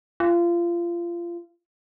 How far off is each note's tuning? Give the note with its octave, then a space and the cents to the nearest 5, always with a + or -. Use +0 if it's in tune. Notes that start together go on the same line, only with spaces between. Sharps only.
F4 -25